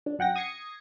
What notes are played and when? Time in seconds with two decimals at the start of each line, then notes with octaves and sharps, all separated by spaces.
0.06 D4
0.19 F#2 F#5 G5 A#6
0.36 D#6 G#6 A#6 C7 C#7